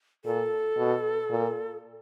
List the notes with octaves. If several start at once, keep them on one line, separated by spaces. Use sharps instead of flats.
A#2 A4
B2
A#2